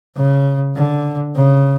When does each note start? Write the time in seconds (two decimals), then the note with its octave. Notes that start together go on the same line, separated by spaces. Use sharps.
0.16 C#3
0.75 D3
1.35 C#3